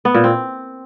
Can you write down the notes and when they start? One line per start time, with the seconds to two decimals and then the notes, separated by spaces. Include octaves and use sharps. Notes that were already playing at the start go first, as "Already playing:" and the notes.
0.05 B3
0.14 A#2
0.24 C4